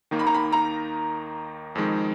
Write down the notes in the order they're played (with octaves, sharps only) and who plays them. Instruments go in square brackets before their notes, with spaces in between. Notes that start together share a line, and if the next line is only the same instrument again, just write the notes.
[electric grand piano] D#2 D#3 A#3 D#4
[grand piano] B5
A#5
B5
A#5
[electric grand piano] F2 D#3 G#3 D#4